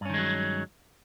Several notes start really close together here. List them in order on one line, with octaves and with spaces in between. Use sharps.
G2 C#4 D#3 G#3 F#3